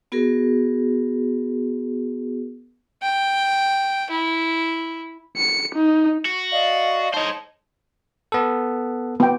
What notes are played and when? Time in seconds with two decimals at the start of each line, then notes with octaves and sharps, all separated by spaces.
0.12 B3 F#4 G#4 A#4
3.02 G5
4.10 E4
5.37 C#7
5.75 D#4
6.25 F#4
6.52 D5 D#5 F5
7.14 D#4 C5 C#5 D#5 A5
8.32 B3 A4
9.20 B3 G5